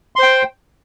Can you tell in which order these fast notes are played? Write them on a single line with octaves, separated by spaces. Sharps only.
C6 C5 G5